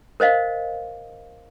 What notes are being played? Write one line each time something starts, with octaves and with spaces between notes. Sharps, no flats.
A#4 C5 D#5 F5